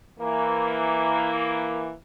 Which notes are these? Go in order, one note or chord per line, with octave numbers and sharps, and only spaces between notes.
E3 A#3